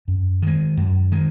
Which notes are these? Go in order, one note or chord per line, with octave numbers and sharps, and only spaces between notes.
F#2
D#3 G#3
F#2
D#3 G#3